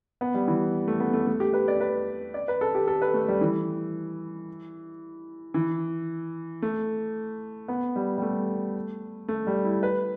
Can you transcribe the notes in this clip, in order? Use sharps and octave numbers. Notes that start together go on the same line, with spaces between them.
B3
G3
E3
A3
B3
A3
A3
G4
B4
D5
B4
D5
B4
A4
G4
A4
B4
A3
G3
E3
E3
A3
B3
G3
G3
A3
A3
G3
E4
B4